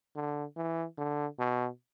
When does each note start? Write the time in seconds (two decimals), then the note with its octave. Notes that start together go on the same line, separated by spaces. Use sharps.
0.15 D3
0.56 E3
0.98 D3
1.39 B2